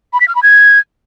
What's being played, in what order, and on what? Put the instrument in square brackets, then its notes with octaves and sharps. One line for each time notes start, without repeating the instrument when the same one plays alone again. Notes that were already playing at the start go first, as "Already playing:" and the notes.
[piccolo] B5
B6
F6
B5
G#6